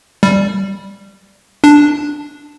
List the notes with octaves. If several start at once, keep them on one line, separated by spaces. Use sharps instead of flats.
G3
D4